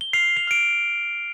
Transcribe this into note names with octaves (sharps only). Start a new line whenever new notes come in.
G7
F6 C7 F7
C7 F7
F6 D7